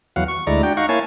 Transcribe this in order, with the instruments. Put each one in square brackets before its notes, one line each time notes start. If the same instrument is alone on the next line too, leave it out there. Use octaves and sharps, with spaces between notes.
[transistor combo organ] E2 F#3 F5 F#5
C#6
D2 G#3 E4 D5 A#5
D4 F#4 G5
D#4 F5 F#5 A#5 C#6
A#3 E4 C#5 F5 G#5 A5